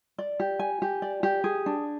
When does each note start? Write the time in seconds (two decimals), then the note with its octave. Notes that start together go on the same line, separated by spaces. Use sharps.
0.18 D5
0.40 G4
0.59 G#5
0.82 G4
1.02 D5
1.23 G4
1.44 G#4
1.66 D4